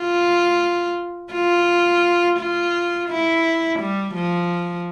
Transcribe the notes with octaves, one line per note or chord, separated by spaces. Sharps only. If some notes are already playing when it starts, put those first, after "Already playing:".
Already playing: F4
F4
F4
E4
G3
F3